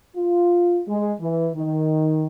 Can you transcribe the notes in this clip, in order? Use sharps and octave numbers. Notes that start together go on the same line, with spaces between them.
F4
G#3
E3
D#3